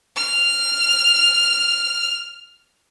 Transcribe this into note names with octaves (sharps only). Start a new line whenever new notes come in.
F6 F7